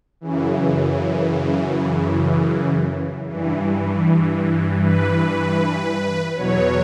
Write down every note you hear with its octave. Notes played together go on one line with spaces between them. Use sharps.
F#2 C#3 E3
G2 E3
B4
E2 B2 F#3 C#5